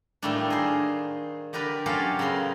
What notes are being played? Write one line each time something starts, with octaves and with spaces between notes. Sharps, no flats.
A2 D#3 G3 A3 A#3 D4
G#4 A#4 C5 C6
D3 G4 A#4 B4 D5 G5
F#3 C#4 F4 G4 A4 F5
C#3 B3 A#4 C6